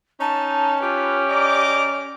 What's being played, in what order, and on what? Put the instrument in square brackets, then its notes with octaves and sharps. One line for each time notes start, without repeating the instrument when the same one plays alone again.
[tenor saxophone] C#4 [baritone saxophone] D#4 [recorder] A5
[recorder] F4 [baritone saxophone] G4 [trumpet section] B4
[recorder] D5 [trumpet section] D#5 A#5 D6